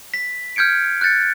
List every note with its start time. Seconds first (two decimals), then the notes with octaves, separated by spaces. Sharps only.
0.14 B6
0.56 F6 G6 G#6 C#7 D7
1.01 F#6 G6 A6 C#7